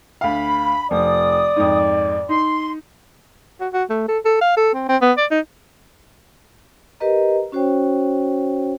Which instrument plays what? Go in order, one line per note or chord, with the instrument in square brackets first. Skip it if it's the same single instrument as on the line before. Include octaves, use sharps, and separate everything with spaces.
[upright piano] D2 F5 [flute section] B5
[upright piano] F1 F3 [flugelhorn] D5 [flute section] D#6
[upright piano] F2 G#2
[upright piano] D#4 [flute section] C6
[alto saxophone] F#4
F#4
A3
A4
A4
F5
A4
C4
C4
B3
D5
D#4
[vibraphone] G4 A#4 B4 D#5 A#5
C#4 F#4 C5 C#5 G5